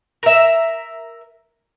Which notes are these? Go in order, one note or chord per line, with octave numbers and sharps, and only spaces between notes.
A#4 E5